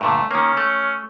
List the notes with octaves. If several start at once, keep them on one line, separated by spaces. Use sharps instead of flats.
G2 A#2 D3 A3
D#3 A#3 C#4
A3